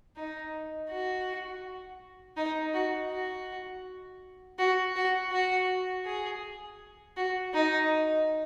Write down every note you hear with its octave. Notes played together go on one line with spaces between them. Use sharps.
D#4
F#4
D#4
F#4
F#4
F#4
F#4
F#4
G#4
F#4
D#4